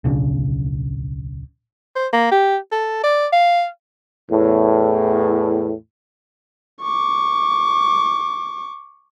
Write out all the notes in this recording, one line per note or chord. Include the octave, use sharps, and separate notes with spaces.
D1 B1 C#3 D4
C5
A#3
G4
A4
D5
F5
E2 A2
C#6 D6